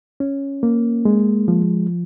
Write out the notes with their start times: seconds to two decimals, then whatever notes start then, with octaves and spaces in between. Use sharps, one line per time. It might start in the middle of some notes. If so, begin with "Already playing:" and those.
0.20 C#4
0.63 A#3
1.05 G#3
1.48 F3